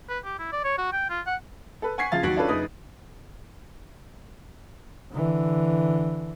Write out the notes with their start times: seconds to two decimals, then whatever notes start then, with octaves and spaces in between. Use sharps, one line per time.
0.09 B4
0.25 G4
0.39 E4
0.52 D5
0.64 C#5
0.78 F#4
0.93 G5
1.10 F4
1.26 F#5
1.82 A4 B4
1.98 F#5 G#5 C#6 G#6 B6 C7
2.12 C#3 F3 F5 A6
2.23 D#2 F#3 F#4 B6 D7 F#7
2.36 C#4 D4 F4 A4 B4 C#5
2.48 F#1 D#4 B4 D#6
5.13 D3 E3